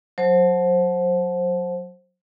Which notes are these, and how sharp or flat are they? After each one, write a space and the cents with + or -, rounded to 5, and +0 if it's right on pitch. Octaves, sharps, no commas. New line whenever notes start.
F#3 -15 C5 +15 A5 -20